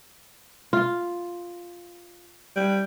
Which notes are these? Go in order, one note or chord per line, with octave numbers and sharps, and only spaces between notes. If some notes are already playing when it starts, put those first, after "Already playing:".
F4
G3